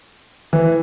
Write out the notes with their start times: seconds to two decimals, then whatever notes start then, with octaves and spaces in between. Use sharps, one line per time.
0.53 E3